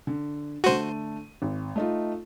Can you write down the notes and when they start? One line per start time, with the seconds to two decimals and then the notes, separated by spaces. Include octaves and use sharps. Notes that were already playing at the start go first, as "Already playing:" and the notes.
0.07 D3
0.64 D3 A3 F#4 C5 D#7
1.42 G#1
1.76 A3 D#4 F4